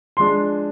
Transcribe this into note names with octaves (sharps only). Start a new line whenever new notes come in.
F3 G#3 D4 C6